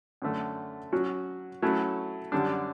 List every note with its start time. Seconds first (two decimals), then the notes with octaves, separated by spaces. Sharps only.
0.22 F#2 D3 A3
0.92 F#3 C#4 F#4
1.62 F#3 A3 C#4 E4
2.32 F#2 D3 G3 D4